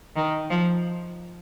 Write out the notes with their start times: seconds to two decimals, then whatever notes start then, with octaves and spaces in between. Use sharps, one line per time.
0.16 D#3
0.50 F3